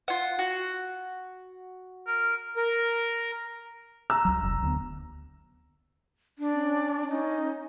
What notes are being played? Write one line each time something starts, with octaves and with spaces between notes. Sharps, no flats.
F4 F#5
F#4
A#4
A#4
A#5 E6
C#2 F#3
F1
D2 B3
D4
C#4
C#4 D#4